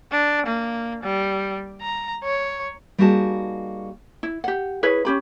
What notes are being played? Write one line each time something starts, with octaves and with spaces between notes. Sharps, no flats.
D4
A#3
G3
A#5
C#5
G3 A#3 D#4 F#4 G#4 A5
E4
G4 F#5
E4 G#4 B4 C#5
C#4 G4 B5